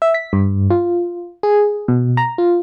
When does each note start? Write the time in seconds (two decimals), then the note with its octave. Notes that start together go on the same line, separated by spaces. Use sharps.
0.02 E5
0.14 B6
0.33 G2
0.70 F4
1.43 G#4
1.88 B2
2.17 A#5
2.38 F4